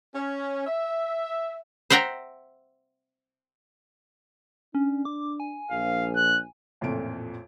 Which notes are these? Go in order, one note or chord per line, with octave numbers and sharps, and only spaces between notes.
C#4
E5
C5 E5 F#5 G5 A#5
C#4 D4
D6
G#5
A#1 F5
F#6
A1 F2 A#2 A3 D7